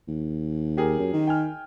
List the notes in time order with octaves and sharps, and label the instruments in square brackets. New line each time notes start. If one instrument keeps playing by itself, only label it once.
[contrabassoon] D#2
[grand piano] G4 G#4 A#4
[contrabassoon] F#2
D#3
[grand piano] G5 G#5 F6